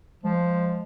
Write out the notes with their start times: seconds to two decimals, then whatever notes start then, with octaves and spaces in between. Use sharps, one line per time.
0.23 F3 G#3